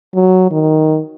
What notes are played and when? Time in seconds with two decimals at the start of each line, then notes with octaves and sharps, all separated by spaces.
0.15 F#3
0.51 D#3